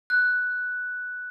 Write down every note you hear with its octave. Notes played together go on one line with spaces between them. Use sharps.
F#6